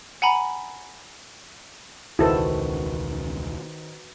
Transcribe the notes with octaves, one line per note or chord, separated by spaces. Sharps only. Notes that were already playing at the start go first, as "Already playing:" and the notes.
F#5 G#5 A#5 B5
E1 C#2 D#3 E4 F#4 A4 B4 C5